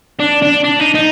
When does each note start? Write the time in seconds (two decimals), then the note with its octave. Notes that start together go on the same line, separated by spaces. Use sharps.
0.20 D4
0.42 D4
0.64 D4
0.80 D#4
0.95 D#4